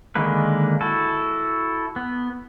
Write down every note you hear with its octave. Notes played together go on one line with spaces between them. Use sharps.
D3 D#3 G#3 A#3 B4
E4 F#4 A4
B3